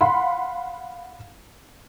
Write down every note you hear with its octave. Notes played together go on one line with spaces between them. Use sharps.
F5 F#5 B5 C6